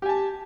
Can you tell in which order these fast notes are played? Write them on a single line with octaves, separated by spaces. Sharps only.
G4 G#5 A5